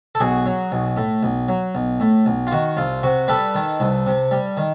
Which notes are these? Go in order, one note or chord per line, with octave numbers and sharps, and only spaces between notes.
A4
B1 F#4 G#4
F#3
B1
A2
B1
F#3
B1
A2
B1
F4
D#3 F#4
C2 F4
C3 F#4
G3 A4 B4
D#3
C2
C3
G3
D#3